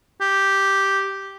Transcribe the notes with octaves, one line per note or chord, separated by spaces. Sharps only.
G4